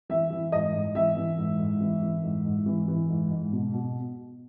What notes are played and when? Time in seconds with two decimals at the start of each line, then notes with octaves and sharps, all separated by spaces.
0.09 E3 E5
0.31 E3
0.52 G#2 D#5
0.73 G#2
0.95 E3 E5
1.17 E3
1.38 G#2
1.59 G#2
1.81 E3
2.02 E3
2.23 G#2
2.45 G#2
2.66 E3
2.88 E3
3.09 G#2
3.31 G#2
3.52 B2
3.73 B2